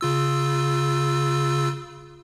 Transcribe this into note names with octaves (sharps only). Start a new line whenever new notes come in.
C#3 F4 E6